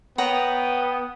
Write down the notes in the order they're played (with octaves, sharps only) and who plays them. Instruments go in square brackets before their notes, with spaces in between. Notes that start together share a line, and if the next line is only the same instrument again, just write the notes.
[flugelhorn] B3 [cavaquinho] C#5 F#5 A#5 [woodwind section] G5 D#6